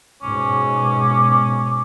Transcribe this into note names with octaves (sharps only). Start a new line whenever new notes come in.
G#2 B2 C#4 D6